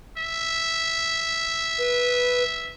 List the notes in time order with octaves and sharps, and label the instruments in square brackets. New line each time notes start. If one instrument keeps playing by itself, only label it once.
[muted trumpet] E5
[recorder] B4